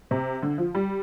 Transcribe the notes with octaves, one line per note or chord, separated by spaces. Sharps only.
C3
D3
F3
G3